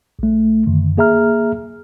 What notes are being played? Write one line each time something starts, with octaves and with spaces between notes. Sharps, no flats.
A#1 A3
F#2 D3 D#3
A#3 G#4 E5 A#5 F6